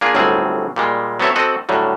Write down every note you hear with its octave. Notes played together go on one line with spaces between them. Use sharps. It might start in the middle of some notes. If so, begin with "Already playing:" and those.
A#3 D4 F4 G#4
G1 A2 F#3 G3 C4 G#4
A#2 G3 G#3
F#3 B3 C4 A4 C#5 E5
C4 F#4 A4 D#5 F#5
A2 D3 F#3 G3